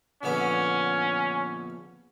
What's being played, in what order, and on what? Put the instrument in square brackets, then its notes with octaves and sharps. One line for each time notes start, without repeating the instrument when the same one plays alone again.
[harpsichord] A#1 D3 B3 [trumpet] C#4